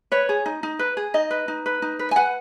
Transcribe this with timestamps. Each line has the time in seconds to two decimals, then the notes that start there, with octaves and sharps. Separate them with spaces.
0.12 B4 C#5
0.29 G#4
0.46 D#4
0.63 D#4
0.79 B4
0.97 G#4
1.14 D#4 D#5
1.31 B4
1.48 D#4
1.66 B4
1.82 D#4
1.99 B4
2.11 G#5
2.16 B4 F#5